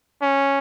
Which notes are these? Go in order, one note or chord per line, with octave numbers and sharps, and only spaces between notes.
C#4